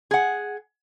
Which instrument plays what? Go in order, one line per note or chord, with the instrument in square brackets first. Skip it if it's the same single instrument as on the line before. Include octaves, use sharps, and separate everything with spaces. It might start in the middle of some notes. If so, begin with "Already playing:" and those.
[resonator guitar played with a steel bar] G#4 F#5